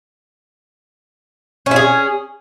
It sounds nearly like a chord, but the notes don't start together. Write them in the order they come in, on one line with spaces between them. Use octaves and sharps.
C#4 E4 G#4